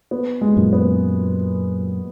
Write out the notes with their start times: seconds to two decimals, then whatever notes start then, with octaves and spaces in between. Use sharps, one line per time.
0.11 B3
0.41 G#3
0.57 F#2 A#2
0.73 B3